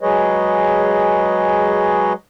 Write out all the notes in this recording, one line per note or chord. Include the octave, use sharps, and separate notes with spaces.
F#3 G#3 G#4 B4 C#5 D#5